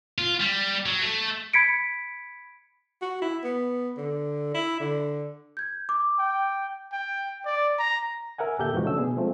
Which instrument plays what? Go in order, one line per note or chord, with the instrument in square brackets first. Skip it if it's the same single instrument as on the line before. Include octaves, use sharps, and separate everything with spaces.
[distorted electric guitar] F4
G3
F#3
A3
[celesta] B5 G#6 B6 C#7 D7
[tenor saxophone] F#4
E4
B3
D3
E4
D3
[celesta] G6 G#6
D6
[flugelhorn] G5
[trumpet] G5
D5
A#5
[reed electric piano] A#4 E5 F#5 G#5
D2 A#2 G4 A4 E5 G6
F#2 B2 E3 F3 G#3 F#4
C#3 A3 D4 C#5 E6
B2 B3 G#4
F3 G#3 A3 C4